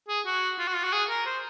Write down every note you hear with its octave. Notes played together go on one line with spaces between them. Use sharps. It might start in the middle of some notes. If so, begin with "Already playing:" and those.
G#4
F#4
F4
F#4
F4
F#4
G#4
A#4
C5